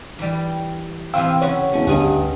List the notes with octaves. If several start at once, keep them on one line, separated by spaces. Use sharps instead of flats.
E3 G3
C3 E3 C4 F5 G5 E6
C#3 F#4 B4 C#5
E1 C#4
D2 G2 F#4 G#4 D#5